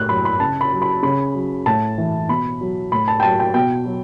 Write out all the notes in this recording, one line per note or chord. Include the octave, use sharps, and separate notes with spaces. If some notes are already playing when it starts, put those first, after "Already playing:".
Already playing: A2 F#6
F#3 B5
B5
C#3 A5
B5
F#3
B5
C#3 B5
F#3
A2 A5
E3
B2 B5
F#3
A2 B5
A5
G5
F#3 A5
G5
B2 G5
F#3